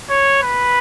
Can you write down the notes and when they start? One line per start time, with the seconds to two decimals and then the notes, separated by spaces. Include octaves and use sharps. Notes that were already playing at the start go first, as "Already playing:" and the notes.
0.10 C#5
0.43 B4